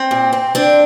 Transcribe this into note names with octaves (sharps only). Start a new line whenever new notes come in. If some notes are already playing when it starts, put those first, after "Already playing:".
Already playing: C4
A#2
C4
C4 D4